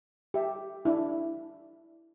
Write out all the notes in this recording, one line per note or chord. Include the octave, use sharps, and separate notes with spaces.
G4 E5
D4 E4